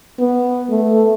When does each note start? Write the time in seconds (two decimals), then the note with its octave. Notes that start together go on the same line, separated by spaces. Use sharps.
0.19 B3
0.71 A3